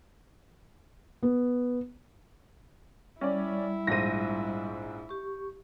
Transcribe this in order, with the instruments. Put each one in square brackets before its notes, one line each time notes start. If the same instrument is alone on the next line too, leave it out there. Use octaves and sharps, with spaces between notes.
[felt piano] B3
[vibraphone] G3 [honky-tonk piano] C#4 D5 [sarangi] E4
[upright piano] A#1 G#2 C5 [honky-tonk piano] A#6 D#7
[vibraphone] G4 C#6